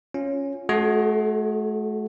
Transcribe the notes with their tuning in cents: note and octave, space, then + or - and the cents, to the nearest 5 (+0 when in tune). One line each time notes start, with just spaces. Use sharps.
C#4 +0 F4 +0
A3 -40 F#4 -5 A4 +0